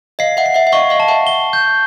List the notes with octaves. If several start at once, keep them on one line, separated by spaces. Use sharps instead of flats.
D#5 F5 C7
E5 F#5
C7
E5 F#5
E5
D#5 F5 C#6
D#5 F5
A5
E5 F#5
G7
G6